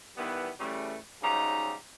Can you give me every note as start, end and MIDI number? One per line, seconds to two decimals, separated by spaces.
0.17 0.51 51
0.17 0.51 52
0.17 0.51 55
0.17 0.51 59
0.60 0.97 49
0.60 0.97 52
0.60 0.97 55
0.60 0.97 57
1.22 1.73 44
1.22 1.73 49
1.22 1.73 54
1.22 1.73 55
1.22 1.73 63
1.22 1.73 82